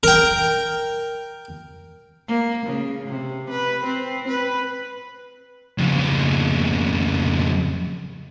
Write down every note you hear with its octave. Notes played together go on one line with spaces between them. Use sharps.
A#4 G5
A#3
C#3
C3
B4
C4
B4
F2 C#3